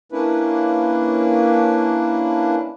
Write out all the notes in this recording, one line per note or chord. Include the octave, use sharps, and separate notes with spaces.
A#3 C#4 D4 E4 B4